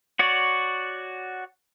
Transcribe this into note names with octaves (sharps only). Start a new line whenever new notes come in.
F#4 C#5 D5